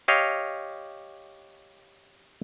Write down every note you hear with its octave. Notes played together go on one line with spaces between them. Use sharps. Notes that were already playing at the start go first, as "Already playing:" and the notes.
G4 C#5 D#5 F5